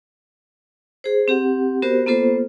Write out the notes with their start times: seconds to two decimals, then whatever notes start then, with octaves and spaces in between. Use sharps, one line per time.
1.04 G#4 C5
1.28 C4 G4 F#5
1.82 B3 F#4 G4 A#4 C5
2.06 A#3 B3 F4 A4 C5